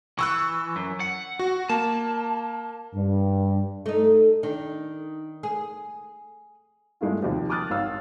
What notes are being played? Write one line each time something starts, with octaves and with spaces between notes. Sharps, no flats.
E3 C#6 E6 F#6
F#2
F#5
F#4
A#3 A5
G2
A3 D#4
D#3 D4
G#4
G2 G#3 A3 E4 F4
D#2 C3 F3
A5 D6 D#6 F6 F#6 A6
G#1 G4 C#5 F5 E6 F6